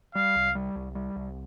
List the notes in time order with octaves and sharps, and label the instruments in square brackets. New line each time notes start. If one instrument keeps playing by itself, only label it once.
[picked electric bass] G3 [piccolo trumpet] F5
[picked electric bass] C2
G3
C2
G3
C2